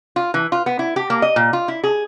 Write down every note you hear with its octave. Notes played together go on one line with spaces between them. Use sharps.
F4
E3
F4
B3
E4
G4
A#3
D#5
A#2
F4
E4
G#4